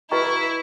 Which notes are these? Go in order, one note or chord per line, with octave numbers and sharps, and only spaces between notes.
E4 F#4 B4 D#5 A#5 C#6